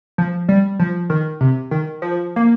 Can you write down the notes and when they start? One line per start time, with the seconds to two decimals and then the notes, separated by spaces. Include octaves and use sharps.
0.18 F3
0.49 G3
0.80 F3
1.10 D#3
1.41 C3
1.71 D#3
2.02 F3
2.36 A#3